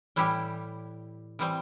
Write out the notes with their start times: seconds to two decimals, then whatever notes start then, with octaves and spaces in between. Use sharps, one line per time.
0.16 A2 E3 G3 E4 G4
1.39 E3 G3 C4